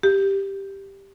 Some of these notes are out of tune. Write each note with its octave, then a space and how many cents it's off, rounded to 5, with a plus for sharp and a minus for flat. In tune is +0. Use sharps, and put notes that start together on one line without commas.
G4 +0